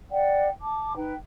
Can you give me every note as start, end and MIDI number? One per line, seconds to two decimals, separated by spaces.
0.12 0.49 74
0.12 0.49 78
0.12 0.49 79
0.61 0.93 81
0.61 0.93 86
0.96 1.14 63
0.96 1.14 71
0.96 1.14 79